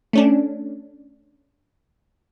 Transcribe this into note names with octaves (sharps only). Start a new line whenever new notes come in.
A3 C#4 D4